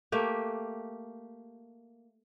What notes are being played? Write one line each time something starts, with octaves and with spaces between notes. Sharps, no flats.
A3 A#3 G4